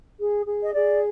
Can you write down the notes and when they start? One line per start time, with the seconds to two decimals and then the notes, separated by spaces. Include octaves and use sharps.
0.19 G#4
0.46 G#4
0.63 D#5
0.74 G#4 D5